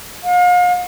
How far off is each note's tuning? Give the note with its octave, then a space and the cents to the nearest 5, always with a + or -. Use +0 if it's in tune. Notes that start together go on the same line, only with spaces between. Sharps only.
F5 +40